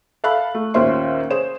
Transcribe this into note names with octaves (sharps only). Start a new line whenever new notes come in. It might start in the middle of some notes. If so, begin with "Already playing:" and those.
A4 E5 F5 B5 F#6
A3
D#2 A#2 C#4 C5 E5 C6
G#4 C5 C#5 E7